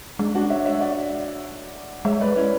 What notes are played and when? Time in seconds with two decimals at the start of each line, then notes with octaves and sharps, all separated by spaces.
0.19 G#3 D4
0.35 D4 F#4
0.50 C#5 E5
0.66 C#5 E5
0.81 D5 F#5
2.05 G#3 C#5 E5
2.21 B4 D5
2.36 C#4 E4